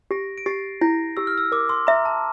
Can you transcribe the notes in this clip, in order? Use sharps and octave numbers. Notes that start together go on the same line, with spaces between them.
G4 A#6 D7
D7
G4 A6 C7
E4 G6 A#6
G4 E6
F6
E6
A#4 D6
C6
E5 A#5
A5